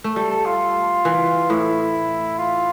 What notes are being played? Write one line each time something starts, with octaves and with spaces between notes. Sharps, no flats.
A3
G3 A4
A4
F4
E3
A2 E4
F4